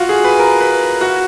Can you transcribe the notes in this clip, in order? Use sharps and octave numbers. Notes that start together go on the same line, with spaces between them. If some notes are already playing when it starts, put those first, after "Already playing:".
Already playing: F4 F#4
G#4
B4
A#4
B4
F#4